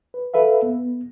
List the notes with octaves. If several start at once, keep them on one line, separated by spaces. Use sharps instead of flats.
B4
A4 B4 E5 F5
B3